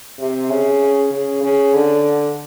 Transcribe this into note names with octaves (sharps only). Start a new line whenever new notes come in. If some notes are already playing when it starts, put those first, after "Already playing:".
C3
C#3
C#3
C#3
D3